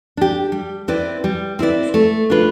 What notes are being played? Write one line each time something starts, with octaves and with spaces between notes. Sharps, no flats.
D4 G4
G3
C4 E4 B4 D5
G3
C4 E4 B4 D5
A3
D4 F4 B4